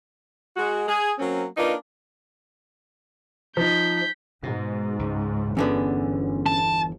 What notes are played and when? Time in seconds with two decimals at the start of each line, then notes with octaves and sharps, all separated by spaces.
0.57 G#3 F#4
0.88 G#4
1.19 F#3 A#3 C4 C#4
1.57 A#3 D4 D#4 F4 B4
3.57 F3 D#4 G6 B6
4.43 G#2 B2
4.99 C#2
5.57 G1 E2 D3 B3 C#4
6.46 A5